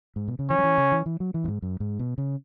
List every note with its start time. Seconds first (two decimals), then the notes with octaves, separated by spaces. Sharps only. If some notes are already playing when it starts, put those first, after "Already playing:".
0.16 G#2
0.28 B2
0.39 C#3
0.49 E3 C#4
0.58 F#3
0.64 E3
0.78 C#3
0.92 E3
1.06 E3
1.20 F#3
1.34 E3
1.44 F#2
1.48 G#2
1.62 F#2
1.80 G#2
1.99 B2
2.18 C#3